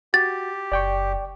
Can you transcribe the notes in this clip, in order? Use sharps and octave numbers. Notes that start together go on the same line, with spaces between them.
F#4 G4 A6
F#1 D5 G5 C#6